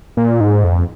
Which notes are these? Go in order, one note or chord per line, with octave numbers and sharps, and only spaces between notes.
A#2
G#2
F2